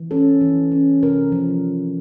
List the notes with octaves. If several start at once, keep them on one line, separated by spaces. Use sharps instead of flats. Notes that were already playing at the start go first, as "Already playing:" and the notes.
Already playing: E3
C#4 A4
E3
C#4
C3 A#4
F3